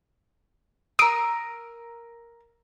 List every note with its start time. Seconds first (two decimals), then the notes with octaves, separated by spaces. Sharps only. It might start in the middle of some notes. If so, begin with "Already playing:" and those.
0.99 A#4 D#6 E6 C7 D7